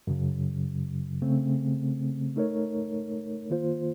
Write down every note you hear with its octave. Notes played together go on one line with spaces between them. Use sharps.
F#2 C#3 F#3
C#3 A3 C4
A3 D#4 A#4 C#5
D#3 A#3 F4 C5